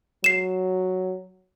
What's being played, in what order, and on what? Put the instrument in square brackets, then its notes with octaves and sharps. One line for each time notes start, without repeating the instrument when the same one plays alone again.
[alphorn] F#3 [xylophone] C7 E7